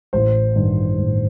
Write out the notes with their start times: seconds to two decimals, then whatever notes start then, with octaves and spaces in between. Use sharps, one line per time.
0.13 A1 C5
0.56 G2 D#3
0.98 A1